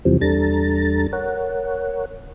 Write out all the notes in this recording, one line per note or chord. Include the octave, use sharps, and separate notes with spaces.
E2 C3 E3 F3 G3 C4
E2 G3 D4 A4 A#5 A6
A#4 C#5 F#5